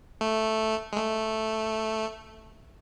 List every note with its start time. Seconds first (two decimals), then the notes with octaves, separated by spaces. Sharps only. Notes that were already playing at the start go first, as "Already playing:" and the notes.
0.21 A3
0.93 G#3
0.97 A3